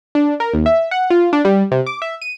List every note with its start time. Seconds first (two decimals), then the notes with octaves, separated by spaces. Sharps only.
0.15 D4
0.40 A#4
0.54 D#2
0.66 E5
0.91 F#5
1.10 F4
1.33 D4
1.45 G3
1.71 C3
1.86 D6
2.02 E5
2.22 D#7